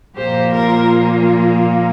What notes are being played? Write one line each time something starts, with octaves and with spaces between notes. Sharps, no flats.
A#2 F3 A#3 G4 C5
F4 A#4
F4